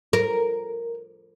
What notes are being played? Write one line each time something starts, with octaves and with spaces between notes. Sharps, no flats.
A#4